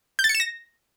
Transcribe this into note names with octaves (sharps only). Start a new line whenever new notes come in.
G6
A6
C#7
E7
A#6